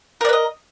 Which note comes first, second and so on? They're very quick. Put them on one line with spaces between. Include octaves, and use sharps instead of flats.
A#4 D5 B4 D#5